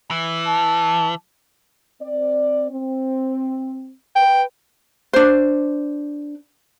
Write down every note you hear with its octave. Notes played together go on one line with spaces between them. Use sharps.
E3
A5
C4 D5
C4
B4 G5
D4 C5